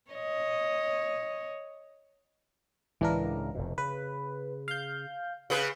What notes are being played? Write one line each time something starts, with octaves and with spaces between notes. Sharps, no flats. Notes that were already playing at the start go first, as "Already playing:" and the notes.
C#5 D#5
C#2 A2 C#3 E3 D4 A#4
F1 F2 B2
C#3 B4
F5 G6
C#3 B3 B4